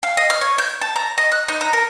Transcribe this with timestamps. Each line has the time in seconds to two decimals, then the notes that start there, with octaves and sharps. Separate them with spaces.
0.03 F5
0.17 D#5
0.30 F6
0.41 C#5
0.58 G6
0.81 A5
0.96 A#5
1.18 D#5
1.32 F#6
1.48 D#4
1.61 A#5
1.73 A#4